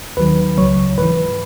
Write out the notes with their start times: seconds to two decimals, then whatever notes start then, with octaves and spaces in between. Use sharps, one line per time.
0.17 D#2 D#3 F#3 B4
0.57 C#2 C#3 F#3 C#5
0.98 G#2 E3 B4